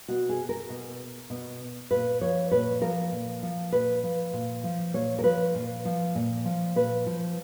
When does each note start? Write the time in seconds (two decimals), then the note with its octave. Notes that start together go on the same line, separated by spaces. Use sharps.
0.08 B2 F#4
0.29 G#4
0.49 A#4
0.70 B2
1.30 B2
1.91 A#2 B4
2.21 F3 C#5
2.51 A#2 B4
2.81 F3 A#4
3.12 A#2
3.43 F3
3.72 A#2 B4
4.03 F3
4.33 A#2
4.64 F3
4.94 A#2 C#5
5.19 A#4
5.24 F3 B4
5.55 A#2
5.85 F3
6.15 A#2
6.45 F3
6.76 A#2 B4
7.06 F3